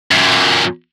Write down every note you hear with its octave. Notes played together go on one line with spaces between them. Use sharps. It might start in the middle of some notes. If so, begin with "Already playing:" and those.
F#2 A#2